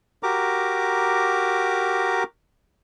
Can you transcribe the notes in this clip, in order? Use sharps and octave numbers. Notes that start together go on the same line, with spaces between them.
F#4 G4 A#4 A#5 D6